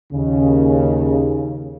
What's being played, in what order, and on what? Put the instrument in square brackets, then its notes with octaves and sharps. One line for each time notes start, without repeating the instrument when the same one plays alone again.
[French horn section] D#2 C#3